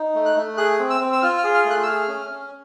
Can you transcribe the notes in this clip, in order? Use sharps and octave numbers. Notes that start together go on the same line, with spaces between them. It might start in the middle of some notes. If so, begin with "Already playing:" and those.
Already playing: D#4
A3
F#6
A3
G#4 F#6
C4
E6
C4
E6
F4 F6
F6
G#4
F6
A3
F#6
E6
G#4 F6
C#4
C#4